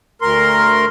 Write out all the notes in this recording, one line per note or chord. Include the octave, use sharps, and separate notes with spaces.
D2 A#4 C6